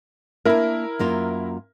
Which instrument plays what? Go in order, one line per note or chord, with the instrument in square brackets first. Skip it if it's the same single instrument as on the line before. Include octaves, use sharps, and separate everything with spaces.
[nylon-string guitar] A#3 D4 [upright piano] E4 A#4
[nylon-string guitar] F#2 A#3 F4